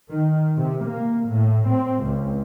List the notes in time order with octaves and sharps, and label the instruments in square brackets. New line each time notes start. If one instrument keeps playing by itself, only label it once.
[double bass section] D#3
C3
A#3
A2
C4
C#2